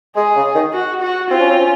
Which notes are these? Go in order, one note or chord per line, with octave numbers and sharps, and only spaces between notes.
G#3 G#4
C#3
D#3
F#4
F#4
C4 F4
C#4
C4
C#4